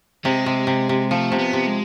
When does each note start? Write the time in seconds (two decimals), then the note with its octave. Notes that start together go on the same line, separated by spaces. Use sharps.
0.25 C3 G#3
0.46 C3
0.67 C3
0.89 C3
1.11 F3 A3
1.32 C3
1.39 B3
1.53 C3
1.67 G#3